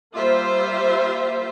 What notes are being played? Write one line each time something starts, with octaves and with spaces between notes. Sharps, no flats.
G3 A#3 F4 C5 E5